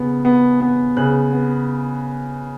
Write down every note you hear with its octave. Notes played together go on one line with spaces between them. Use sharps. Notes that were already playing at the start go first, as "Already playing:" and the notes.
Already playing: C#3 B3
B3
B3
C#3 F#6
B3